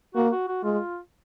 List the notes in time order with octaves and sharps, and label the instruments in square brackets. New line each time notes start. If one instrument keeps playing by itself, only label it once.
[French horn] A#3 [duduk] F#4
[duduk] F#4
F#4
[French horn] G#3 [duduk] F4